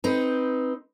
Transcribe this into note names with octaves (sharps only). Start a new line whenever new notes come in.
C4 D#4 B4